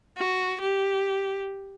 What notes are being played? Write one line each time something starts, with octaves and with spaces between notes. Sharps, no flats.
F#4
G4